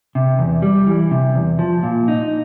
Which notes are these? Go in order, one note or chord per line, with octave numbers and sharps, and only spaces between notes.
C3
E2
G3
E3
C3
E2
F3
A#2
D#4